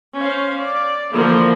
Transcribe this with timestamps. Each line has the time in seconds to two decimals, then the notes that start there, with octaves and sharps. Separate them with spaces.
0.16 C#4 C5 F5
0.59 D5
1.12 D3 E3 F3 A#3